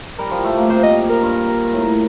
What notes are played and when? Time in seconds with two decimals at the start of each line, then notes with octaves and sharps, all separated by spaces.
0.18 G3 A#4
0.31 F3
0.44 A3
0.57 A#3
0.70 C3 C5
0.83 A#2 D#5
1.09 A#4
1.22 G2
1.73 A2